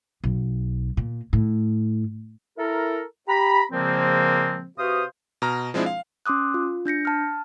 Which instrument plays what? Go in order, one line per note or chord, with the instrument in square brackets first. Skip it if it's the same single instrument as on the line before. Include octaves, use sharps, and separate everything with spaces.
[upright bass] B1
A#2
A2
[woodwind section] E4 A4 A#4
G4 A#5 B5
A#2 C#3 F3 G#3 A#3 C4
C3 F#4 B4 C5 F5 D#6
[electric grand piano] B2 A#5 F6
F3 G#3 C4 D4 E4
F5
[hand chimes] C#4 C6 D6 D#6 F#6
F4
D4 G6 A#6 C#7
A5 F6